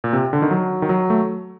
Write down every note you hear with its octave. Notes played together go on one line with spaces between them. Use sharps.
A#2
C3
D3
D#3
F#3
D#3
F#3
A3